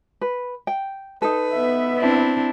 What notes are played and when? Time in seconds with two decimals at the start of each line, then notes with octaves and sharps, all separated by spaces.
0.21 B4
0.67 G5
1.22 D#4 A4 B4
1.53 B3 E5
1.99 C4 D4 E4